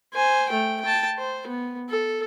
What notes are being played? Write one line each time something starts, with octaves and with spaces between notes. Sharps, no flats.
C5 G#5
A3 G5
G5 A5
C5
B3
A4